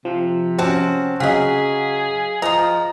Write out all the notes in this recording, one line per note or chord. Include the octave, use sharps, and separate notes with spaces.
C3 F3
C4 C#4 F#4 A5 D6
C#3 F#3 G#4 D#5 F5 F#5 B6
F3 C5 D#5 A#5 D#6